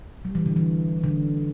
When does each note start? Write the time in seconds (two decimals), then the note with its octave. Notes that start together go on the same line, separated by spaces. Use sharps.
0.25 G3
0.35 E3
0.46 D3
0.56 E3
1.04 D3